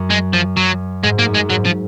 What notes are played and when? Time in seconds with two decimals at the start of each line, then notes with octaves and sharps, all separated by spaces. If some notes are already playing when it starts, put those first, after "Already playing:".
Already playing: F#2
0.10 G#3
0.33 F3
0.57 F#3
1.03 G#2 G#3
1.19 A#3
1.26 F#2
1.34 G#3
1.50 G#2 F#3
1.65 F3